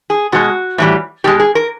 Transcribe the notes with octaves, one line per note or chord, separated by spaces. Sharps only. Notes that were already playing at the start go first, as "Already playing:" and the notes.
G#4
B2 G#3 F#4
A2 E3 G3
B2 G#3 G4
G#4
A#4